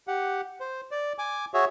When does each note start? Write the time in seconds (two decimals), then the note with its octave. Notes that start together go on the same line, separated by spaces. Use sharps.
0.08 G4 F#5
0.60 C5
0.91 D5
1.18 G#5 D6
1.54 F#4 G#4 C#5 E5